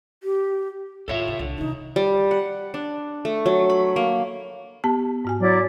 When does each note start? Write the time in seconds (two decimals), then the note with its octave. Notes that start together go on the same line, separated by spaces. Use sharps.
0.23 G4
1.08 D#2 A2 F4 A4 C#5 E5
1.28 C#3
1.39 C2 D3
1.58 C3 D#3 D#4
1.96 G3
2.31 F#5
2.74 D4
3.25 A3
3.46 F#3
3.70 B5
3.96 A#3
4.84 B3 G4 A5
5.25 G#2 F#4 G#5
5.41 F#3 E4 D5